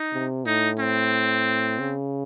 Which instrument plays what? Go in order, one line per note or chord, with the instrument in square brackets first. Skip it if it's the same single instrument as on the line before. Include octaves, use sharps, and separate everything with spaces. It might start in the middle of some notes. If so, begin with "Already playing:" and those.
Already playing: [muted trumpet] D#4
[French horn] C3
[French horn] A2 [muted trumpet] D#4
[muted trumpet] C4
[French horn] C#3